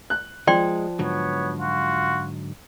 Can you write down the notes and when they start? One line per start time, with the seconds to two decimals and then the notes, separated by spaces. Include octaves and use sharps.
0.10 F#6
0.47 F3 G#3 D5 G5 C6
0.99 G#2 D3 F#3 B3 C#5
1.59 F4 F#4